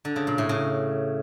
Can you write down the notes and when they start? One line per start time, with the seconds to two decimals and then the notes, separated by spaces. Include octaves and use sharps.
0.05 D3
0.16 C#3
0.27 A#2
0.38 A2
0.49 C#3